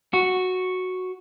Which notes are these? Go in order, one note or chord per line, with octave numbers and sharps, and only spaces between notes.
F#4